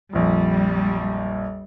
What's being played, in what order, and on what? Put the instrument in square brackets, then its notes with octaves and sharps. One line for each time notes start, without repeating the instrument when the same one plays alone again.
[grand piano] A#1 F2 [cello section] G3